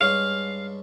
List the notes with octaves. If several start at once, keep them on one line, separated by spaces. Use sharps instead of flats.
G2 G#3 C#4 F5